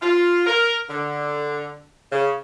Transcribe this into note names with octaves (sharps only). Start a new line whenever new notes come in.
F4
A#4
D3
C#3